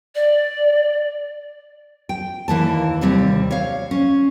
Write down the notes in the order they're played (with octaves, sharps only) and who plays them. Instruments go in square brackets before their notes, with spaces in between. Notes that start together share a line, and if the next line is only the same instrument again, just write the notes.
[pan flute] D5
[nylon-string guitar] G5
D#2 E3 A#3 A5
D#2 C3 G3 C4
C#5 F5
C#4